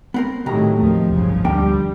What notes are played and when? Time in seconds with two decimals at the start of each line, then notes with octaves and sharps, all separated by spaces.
0.14 B3 C4 A#4
0.46 A2 C3 D#3 F#3 A#5
0.79 D#2 D#3 F3 A3
1.12 G1 C2 F#2 C#3
1.45 D2 G3 A#3 D4 G5